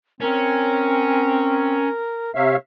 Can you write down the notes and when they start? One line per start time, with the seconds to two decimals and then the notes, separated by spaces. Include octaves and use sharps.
0.21 C4 C#4 A#4
2.35 C3 C#5 E5 F5